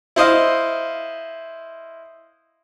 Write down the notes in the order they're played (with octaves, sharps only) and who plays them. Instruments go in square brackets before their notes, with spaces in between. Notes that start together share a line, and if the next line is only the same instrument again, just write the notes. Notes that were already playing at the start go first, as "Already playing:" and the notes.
[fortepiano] E4 C5 D#5 F5